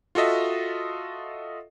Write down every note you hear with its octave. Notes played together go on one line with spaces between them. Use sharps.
F4 F#4 A4 D#5 E5